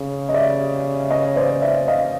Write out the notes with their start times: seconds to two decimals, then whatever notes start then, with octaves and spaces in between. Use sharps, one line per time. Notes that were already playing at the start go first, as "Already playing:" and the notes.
Already playing: C#3
0.29 D#5
0.34 D5 E5
1.10 C#5 D#5
1.36 C5 D5
1.62 D5 E5
1.88 D#5 F5